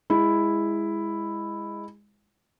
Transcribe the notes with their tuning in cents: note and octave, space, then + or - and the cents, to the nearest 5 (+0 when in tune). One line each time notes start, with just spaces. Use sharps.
G#3 -10 E4 +0